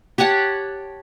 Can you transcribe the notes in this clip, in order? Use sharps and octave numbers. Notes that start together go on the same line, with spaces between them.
G4 C#5 F#5 A5